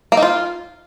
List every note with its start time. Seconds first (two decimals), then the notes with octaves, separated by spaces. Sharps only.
0.12 A#3
0.17 D#4
0.22 F4